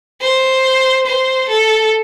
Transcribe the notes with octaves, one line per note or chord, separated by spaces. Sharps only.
C5
C5
A4